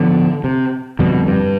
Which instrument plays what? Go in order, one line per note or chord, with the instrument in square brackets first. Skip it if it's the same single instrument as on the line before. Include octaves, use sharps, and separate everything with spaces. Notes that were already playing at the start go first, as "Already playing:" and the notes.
Already playing: [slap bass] A2 F3 B3 [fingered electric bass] D3
[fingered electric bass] C3
[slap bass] F2 D3 G3 [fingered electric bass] B2
[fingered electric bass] G2